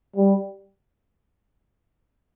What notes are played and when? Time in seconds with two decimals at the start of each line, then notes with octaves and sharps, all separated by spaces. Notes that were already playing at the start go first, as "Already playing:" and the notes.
0.16 G3